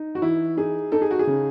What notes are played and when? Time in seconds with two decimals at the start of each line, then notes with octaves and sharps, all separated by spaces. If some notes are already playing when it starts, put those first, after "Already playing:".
Already playing: D#4
0.15 F#4
0.22 E3 E4
0.57 D#4 G#4
0.92 D#4 A4
1.02 G#4
1.11 F#4
1.19 G#4
1.27 C#3